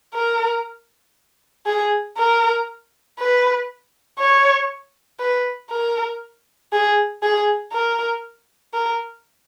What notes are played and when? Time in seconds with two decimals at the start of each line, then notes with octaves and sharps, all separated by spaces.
0.14 A#4
1.66 G#4
2.17 A#4
3.19 B4
4.19 C#5
5.20 B4
5.70 A#4
6.72 G#4
7.22 G#4
7.72 A#4
8.74 A#4